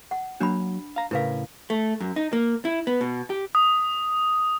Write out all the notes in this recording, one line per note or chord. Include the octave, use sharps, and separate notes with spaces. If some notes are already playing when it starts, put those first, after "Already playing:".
F#5
F#3 A#3 D4 F#4 B5
F5 A#5
A2 C#3 E4 A#4 B4 F5
A3
F#2
D#4
A#3
E4
B3
B2
G4
D#6